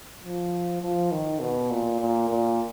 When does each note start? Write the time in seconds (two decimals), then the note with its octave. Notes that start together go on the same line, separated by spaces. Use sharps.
0.23 F3
0.82 F3
1.11 D#3
1.41 B2
1.70 A#2
2.00 A#2
2.29 A#2